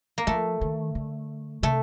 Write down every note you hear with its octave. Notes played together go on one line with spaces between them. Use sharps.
A#3
F3 A3
D#3
D3
C3 A3